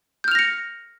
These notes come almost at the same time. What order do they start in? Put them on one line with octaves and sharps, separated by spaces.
G6 F6 F7 A#6 C#7